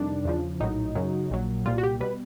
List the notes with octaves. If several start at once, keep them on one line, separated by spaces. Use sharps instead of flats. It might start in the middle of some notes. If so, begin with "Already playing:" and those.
Already playing: F2 C3 D#3 G3 D4
E2 C#3 F3
A#1 A2 F#3 D#4
F#2 C#3 F#3
A#1 A#2 F#3
C2 A#2 G3 F4
F#4
G4
B2 G3 B4